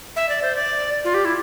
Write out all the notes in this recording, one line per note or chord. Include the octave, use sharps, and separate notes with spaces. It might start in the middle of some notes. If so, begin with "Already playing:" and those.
E5
D5
C5
D5
F4
G4
E4